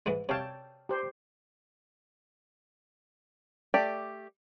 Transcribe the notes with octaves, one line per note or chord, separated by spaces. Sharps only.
G#2 E3 G#3
C3 C#5 F5 G5 A5
G4 C5
A3 G4 D5